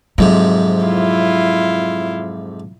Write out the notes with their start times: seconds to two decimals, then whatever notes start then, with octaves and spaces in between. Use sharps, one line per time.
0.18 F2 G#2 C3 F#3
0.85 E4 F4